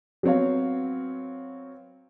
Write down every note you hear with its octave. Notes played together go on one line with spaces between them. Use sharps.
F#3 B3 C4 C#5 F5